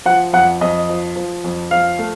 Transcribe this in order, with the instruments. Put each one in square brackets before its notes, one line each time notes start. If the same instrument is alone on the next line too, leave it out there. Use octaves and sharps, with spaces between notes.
[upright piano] F3 F#5
F2 F#5
F2 D#5
F3
F3
F2
F3 F5
A3